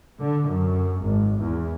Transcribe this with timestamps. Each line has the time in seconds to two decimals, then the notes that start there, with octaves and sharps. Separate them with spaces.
0.19 D3
0.49 F#2
1.03 G#1
1.41 E2